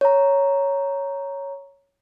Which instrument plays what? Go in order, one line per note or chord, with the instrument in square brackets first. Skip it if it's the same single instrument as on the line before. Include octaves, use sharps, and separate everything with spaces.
[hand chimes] C#5 A#5